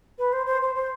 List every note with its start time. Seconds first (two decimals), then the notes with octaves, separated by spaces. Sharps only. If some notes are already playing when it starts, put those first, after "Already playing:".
0.18 B4
0.33 C5
0.46 C5
0.62 C5
0.75 C5